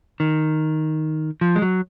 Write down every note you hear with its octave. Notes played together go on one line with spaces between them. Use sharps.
D#3
F3
G#3
F#3